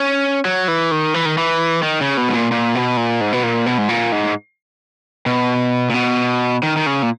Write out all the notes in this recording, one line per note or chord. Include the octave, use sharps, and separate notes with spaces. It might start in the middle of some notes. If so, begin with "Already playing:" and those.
Already playing: C#4
F#3
E3
D#3
E3
D#3
E3
D#3
C#3
B2
G#2
A#2
A#2
B2
A#2
G#2
B2
A#2
B2
G#2
A#2
G#2
B2
A#2
B2
D#3
D#3
C#3
A#2